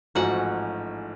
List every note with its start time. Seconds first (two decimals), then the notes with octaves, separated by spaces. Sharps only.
0.15 A1 G#2 F3 F#4 F#5